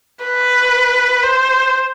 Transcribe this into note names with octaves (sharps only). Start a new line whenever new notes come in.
B4
C5